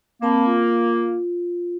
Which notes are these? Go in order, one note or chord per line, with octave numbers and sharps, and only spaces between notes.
A#3 C4 A5 B5
F4